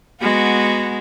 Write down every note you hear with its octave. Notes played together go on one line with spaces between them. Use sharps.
G#3 B3 F#4